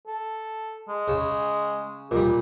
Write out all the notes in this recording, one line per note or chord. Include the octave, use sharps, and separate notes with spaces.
A4
G#3
C#3
A#2 G3